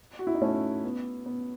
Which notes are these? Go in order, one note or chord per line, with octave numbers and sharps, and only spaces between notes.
F#4
E4
D#4
A3 C#4
B3
B3